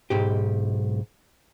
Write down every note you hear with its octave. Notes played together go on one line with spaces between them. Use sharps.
B1 G#2 G4